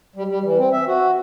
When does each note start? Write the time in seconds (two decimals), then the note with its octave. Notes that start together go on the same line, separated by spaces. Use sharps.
0.16 G3
0.28 G3
0.44 E3
0.59 C4
0.72 E5
0.88 F#4